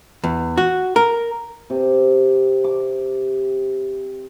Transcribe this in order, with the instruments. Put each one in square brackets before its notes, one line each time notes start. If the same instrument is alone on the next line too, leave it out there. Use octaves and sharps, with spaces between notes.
[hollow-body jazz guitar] E2
F#4
A#4
[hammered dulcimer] C3
D6